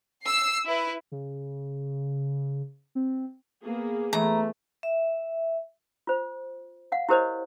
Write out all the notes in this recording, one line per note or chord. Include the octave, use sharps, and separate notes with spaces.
E6 C7
E4 B4
C#3
C4
A#3 B3 G#4
E2 A3 A#5
E5
F4 C5
F5 F#5
E4 G4 A#4 C5 C#5 D#5